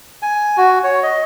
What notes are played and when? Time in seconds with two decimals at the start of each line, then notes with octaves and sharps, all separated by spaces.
0.22 G#5
0.57 F#4
0.84 C#5
1.03 D#5